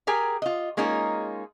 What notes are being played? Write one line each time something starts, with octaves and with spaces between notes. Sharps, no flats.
G4 G#4 A#4 G5 G#5
F4 D#5
G#3 A#3 C#4 D#4 F4 G#4